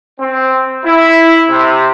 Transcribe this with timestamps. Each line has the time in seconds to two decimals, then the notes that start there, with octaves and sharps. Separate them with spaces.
0.20 C4
0.85 E4
1.49 C3